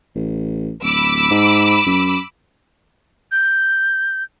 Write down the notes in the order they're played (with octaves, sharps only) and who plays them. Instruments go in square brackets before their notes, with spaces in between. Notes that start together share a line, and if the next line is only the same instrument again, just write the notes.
[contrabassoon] A1
[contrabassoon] D1 [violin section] B5 D6 E6
[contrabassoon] G#2
F#2
[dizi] G6